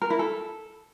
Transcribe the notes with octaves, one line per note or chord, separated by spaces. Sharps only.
A#4
E4
A4